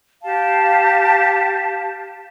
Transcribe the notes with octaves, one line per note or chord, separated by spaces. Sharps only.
G4 F5 A5